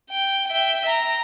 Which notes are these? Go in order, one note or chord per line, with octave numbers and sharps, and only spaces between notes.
G5
E5 G5
A#5